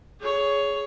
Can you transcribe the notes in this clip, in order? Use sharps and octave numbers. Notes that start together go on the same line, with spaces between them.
G#4 C#5